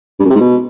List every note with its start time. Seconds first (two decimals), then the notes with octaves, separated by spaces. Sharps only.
0.20 G2
0.25 F#2
0.30 C3
0.35 G#2
0.41 B2